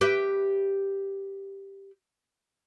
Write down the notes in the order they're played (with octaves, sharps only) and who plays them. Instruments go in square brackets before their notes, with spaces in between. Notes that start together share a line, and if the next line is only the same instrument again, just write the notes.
[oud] G4 B4 E5